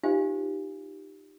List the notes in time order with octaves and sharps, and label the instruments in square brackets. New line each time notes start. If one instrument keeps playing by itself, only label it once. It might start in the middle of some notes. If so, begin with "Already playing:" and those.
[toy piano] D#4 F4 G4 C5 F5 G#5